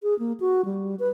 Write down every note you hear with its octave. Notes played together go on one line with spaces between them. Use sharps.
G#4
A#3
F#4
G3
B4